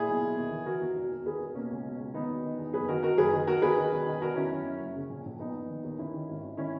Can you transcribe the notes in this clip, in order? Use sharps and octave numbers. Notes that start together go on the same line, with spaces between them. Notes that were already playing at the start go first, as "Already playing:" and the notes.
Already playing: A#2 E4 G#4
B1
B1
D#2
E3
E3 F#4 A#4
D#2
E1
D#2
D#2 G#4 B4
E1
B2 A#3 C#4
C#2
B2
C#2
D#3 B3 D#4
E1
D#3
E2
F#1 G#4 B4
D#3 F#4 A#4
D#3 F#4 A#4
F#1 G#4 B4
D#3
D#2 F#4 A#4
D#2 G#4 B4
D#3
E1
D#3
E1 F#4 A#4
D#3 C#4 E4
F#2
F#2
F#1
C#3
A#1
A#1
A#1 B3 D#4
A#1
D#3
D#2
D#2 C#4 E4
D#3
G#1
G#1
D#3 C#4 E4